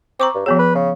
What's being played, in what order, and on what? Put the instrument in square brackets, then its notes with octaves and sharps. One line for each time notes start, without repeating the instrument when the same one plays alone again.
[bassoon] C4 [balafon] A#5 C#6 D6
[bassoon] G2
[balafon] F3 B3 G#4 [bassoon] F#3
[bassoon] B4
C#3